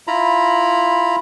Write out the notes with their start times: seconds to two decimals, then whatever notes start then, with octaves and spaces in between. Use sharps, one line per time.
0.07 E4 F4 A#5 B5